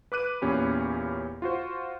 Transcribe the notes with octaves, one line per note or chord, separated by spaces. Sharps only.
B4 D6 F#6 D#7
E2 A#2 C#4 G4 B5
F4 F#4 C5